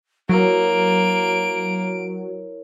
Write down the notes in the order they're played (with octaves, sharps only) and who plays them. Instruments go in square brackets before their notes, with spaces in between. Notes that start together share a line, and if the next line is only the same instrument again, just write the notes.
[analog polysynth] F#3 [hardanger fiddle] A#3 [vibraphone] E4 A#4 C#5 [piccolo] D7